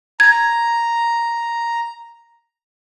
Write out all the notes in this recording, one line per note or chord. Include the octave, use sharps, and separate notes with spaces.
A#5 G#6